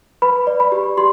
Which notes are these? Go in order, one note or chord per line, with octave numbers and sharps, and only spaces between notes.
B4 B5
D5
B5
G4
G4 C6